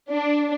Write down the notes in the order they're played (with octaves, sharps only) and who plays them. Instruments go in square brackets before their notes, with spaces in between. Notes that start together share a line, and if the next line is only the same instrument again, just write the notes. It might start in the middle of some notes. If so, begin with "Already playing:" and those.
[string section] D4